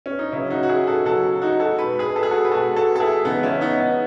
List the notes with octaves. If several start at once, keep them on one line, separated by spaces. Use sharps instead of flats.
C#4
D#4
C#3 F#3 C#4 E4
D#4 F#4
F#4
E4 G#4
F#4 A4
C#3 F#3 F#4 A4
D#4 F#4
F#4 A4
B2 G#3 B4
G#4 B4
A4
G#4
F#4 A4
B4
B2 G#3 F#4 A4
F#4 A4
A4
E4 G#4
C#3 E3 G#3 B3 D#4
C#4 E4
B3 D#4
B3